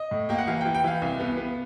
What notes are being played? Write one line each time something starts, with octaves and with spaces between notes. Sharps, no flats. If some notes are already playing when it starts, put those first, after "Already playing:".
Already playing: D#5
A2
A#3 G5
F#5
E3 F5
G5
E3
G5
E3 F5
C2
B3
B3